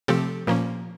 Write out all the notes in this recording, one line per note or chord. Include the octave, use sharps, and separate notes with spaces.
C3 F3 A3 C4 G4 A4
A#2 F3 A#3 C#4